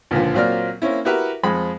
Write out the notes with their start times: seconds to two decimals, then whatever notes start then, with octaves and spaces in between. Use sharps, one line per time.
0.11 C#2 A#2 D3 F3
0.34 A#2 F#3 A#3 C4 D5 F6
0.82 A#3 C4 C#4 E4
1.05 E4 F#4 G4 A#4 B4 E5
1.43 F2 G#3 C4 B5